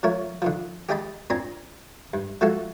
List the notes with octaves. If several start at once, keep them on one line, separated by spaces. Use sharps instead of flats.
F3 A3 A#4 C#5
D3 D#3 F3
G4 G#4 D#5 G5 A5 B5
A#2 C4 D4 G#5 A#5
G2
F3 G#3 A3 F#4 A4